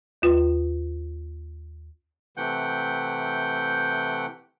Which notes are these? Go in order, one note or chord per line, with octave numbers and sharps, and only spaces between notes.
D#2 F4 B4
C3 E3 A3 F#5 G5 G6